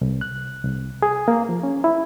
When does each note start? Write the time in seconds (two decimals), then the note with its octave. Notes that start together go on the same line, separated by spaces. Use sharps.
0.01 C2
0.21 F#6
0.64 C2
1.02 G#4
1.28 A#3
1.49 F3
1.63 C#4
1.84 E4